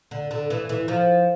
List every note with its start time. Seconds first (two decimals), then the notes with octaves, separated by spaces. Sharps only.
0.11 D3
0.31 D3
0.50 E3
0.69 E3
0.88 F3